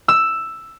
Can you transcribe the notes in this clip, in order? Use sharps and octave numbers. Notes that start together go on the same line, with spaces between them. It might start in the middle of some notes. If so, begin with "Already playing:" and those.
E6